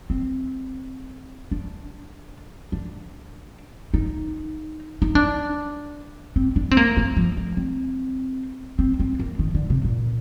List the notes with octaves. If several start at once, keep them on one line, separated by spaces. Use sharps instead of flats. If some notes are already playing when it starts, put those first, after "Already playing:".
C4
D4
D4
D#4
D#4
D4
C4
D4
C4
A#3
A3
F3
A3
C4
C4
C4
A#3
D#3
D3
C3
A#2